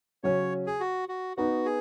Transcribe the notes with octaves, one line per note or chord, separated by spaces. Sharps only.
C#3 F#3 C#4 C#5
G#4
F#4
F#4
B3 D#4 F#4 B4
G#4